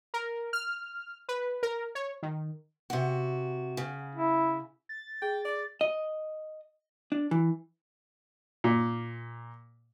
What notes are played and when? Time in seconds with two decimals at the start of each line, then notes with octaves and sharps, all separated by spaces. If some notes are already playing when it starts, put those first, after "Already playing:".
0.14 A#4
0.53 F6
1.29 B4
1.63 A#4
1.95 C#5
2.23 D#3
2.90 C3 F#4
3.77 C#3
4.15 E4
4.89 A6
5.22 G#4 G5
5.45 D5
5.81 D#5
7.12 D4
7.31 E3
8.64 A#2